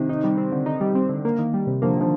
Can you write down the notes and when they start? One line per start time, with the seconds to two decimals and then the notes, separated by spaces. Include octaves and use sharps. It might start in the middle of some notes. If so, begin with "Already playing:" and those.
Already playing: C3 D#3
0.09 D#4
0.24 G3
0.37 C4
0.52 D3
0.66 D#4
0.81 G3
0.95 C4
1.09 D3
1.25 A#3
1.39 D#3
1.54 G3
1.67 C3
1.82 D3 F3 A#3
1.97 D3 D#3 F3